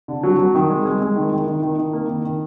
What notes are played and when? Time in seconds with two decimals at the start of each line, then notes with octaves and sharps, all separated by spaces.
0.08 D3
0.23 F#3
0.39 F#3
0.55 D#3
0.70 G#3
0.85 G#3
1.01 G#3
1.16 D#3
1.32 D#3
1.47 D#3
1.63 D#3
1.78 D#3
1.93 A#3
2.09 D#3
2.25 D#3